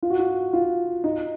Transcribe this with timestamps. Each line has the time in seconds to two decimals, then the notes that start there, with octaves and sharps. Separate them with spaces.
0.03 F4
0.10 F#4
0.19 F4
0.53 F4
1.04 D#4